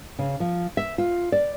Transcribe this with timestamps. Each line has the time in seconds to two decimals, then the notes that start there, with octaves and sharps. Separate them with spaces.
0.19 C#3
0.40 F3
0.77 E5
0.98 F4
1.32 D5